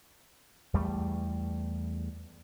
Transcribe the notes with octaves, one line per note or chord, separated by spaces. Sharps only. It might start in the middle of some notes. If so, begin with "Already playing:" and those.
E2 G3 A3